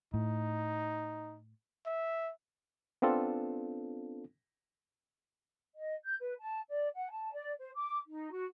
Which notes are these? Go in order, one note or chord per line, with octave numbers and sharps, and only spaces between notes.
A2 D#4
E5
B3 C4 D4 F4 A4
D#5
G6
B4
A5
D5
F#5
A5
D5
C5
D6
D#4
F#4